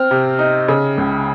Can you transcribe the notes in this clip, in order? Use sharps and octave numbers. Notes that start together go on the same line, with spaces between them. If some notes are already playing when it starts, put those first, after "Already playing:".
Already playing: C4 F6
C3
D#4
C#3
C#2